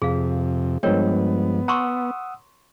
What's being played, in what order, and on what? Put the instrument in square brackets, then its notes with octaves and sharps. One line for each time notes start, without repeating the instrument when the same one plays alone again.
[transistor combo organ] F2 C3 [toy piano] G#4 F5
[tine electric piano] G2 F3 G#3 [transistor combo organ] B3 [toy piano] A#4 C#5 G5
[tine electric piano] F#5 D#6 E6 [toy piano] A#5 C6 C#6